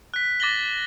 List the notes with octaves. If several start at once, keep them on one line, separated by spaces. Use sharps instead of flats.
F#6 B6
D6 A6 A#6 F#7 G7